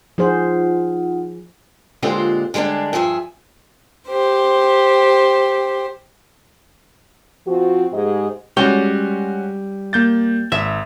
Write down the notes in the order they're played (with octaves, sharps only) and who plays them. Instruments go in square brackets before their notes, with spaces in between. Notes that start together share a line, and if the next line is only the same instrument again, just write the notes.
[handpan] F3 G#4 C5 [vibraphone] D#4 F4 F#5
[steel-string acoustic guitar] A#2 D3 G#3 C4 F4 G4
D3 G3 G#3 C4 D4
G2 F3 G#4 E5
[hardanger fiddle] G4 C5
[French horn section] F3 C4 F4 F#4
G#2 G#3 A3 G4 G#4 D#5
[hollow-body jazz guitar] G3 C#5 G5 [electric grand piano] G#3 C#4 F#4
[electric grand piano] A#3 G6 A6
[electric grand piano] G#1 [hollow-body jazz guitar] E5